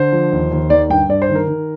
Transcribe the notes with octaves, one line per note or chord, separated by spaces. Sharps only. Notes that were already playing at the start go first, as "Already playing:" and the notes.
Already playing: D3 C5
F3
D#2
D#2
D#3 D5
G2 G5
G2 D5
C5
D#3
A#4
D#3